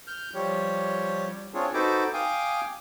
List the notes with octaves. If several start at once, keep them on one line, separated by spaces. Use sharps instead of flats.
F6 G6
F3 G3 G4 C#5
G3
C4 D4 F4 G#4 C#5
D#4 F#4 A4 B4 C5 D6
F5 G5 G#5 D6 D#6